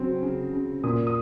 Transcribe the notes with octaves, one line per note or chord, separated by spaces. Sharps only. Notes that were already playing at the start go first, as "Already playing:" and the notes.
Already playing: C#3 F#3 C4
C#3
C#3
A#2 D#6
D#6